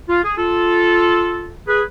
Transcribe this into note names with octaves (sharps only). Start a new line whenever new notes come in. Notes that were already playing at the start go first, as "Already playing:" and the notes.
F4
G#4
F4 A4
G#4 B4